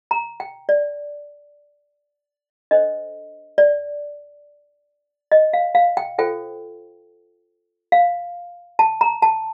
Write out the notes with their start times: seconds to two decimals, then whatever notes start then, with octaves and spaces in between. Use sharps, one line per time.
0.11 A#5
0.40 G5
0.69 D5
2.71 D4 A4 C5 D#5
3.58 D5
5.32 D#5
5.53 F5
5.75 F5
5.97 G5
6.18 F4 A4 C5 G5
7.92 F5
8.79 A5
9.01 A#5
9.22 A5